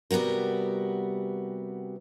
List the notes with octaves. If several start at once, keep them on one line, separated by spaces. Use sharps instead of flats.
C3 G3 B3 F#4 A#4